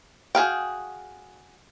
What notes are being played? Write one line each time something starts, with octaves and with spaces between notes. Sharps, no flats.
F#4 G#4 F5 G5